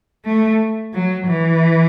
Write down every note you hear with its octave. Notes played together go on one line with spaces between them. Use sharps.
A3
F#3
E3